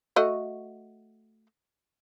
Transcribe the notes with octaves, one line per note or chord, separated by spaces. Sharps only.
A3 F#4 D#5